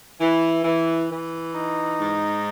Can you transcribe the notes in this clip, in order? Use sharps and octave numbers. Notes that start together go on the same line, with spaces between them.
E3
E3
E3
D#4
G#2